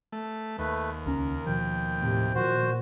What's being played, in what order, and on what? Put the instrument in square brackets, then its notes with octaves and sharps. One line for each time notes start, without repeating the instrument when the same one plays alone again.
[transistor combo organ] A3
[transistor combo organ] D#2 [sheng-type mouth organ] A3 B4
[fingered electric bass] C#2 C#4 [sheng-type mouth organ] A#4
[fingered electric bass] B2 D#3 F3 [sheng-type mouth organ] G5
[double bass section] A2 C3
[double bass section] A#2 F#3 [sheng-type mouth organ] F#4 C5